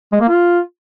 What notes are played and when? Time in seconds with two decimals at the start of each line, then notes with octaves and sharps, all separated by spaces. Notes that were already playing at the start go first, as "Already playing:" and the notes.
0.12 G#3
0.21 A#3
0.29 F4